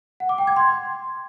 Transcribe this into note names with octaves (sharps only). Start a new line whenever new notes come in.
F#5
D6
G5
G#6
C6